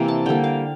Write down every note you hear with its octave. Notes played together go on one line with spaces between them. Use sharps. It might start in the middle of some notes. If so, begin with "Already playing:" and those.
Already playing: C3 E3 A#3
A5
D3 G3 A#3 G5
F5